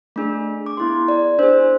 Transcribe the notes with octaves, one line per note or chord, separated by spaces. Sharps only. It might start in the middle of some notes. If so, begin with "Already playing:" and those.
A3 D4 G#4
D6
B3 E4 G#4 C6
D5
D4 G#4 C5